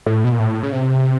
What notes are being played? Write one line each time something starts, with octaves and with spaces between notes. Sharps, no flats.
A2
B2
A#2
A2
C#3
C3